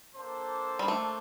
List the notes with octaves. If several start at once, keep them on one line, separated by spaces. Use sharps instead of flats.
A#3 D4 A4 C5
G3
A3